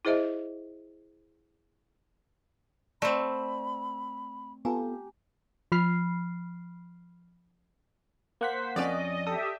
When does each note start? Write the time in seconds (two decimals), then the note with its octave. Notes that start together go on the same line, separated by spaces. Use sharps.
0.05 E4 G#4 C5 D#5 E5
3.02 A3 C4 D5 B5
4.65 B3 F4 G4 A4 G#5 A#5
5.72 F3 B5 F6 C7
8.41 A#3 C5 F#5 B6
8.76 F2 C#4 D5 D#5
9.27 G4 A4 E5 D#6